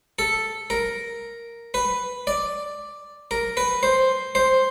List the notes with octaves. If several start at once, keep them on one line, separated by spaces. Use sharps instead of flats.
A4
A#4
B4
D5
A#4
B4
C5
C5